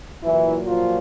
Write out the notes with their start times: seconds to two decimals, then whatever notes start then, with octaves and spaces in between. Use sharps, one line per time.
0.22 A#2 E3 F#3 E4
0.67 F3 F4